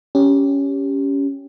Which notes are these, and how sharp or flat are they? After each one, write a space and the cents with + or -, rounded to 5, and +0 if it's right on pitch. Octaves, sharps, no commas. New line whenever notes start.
C#4 +10 G4 +0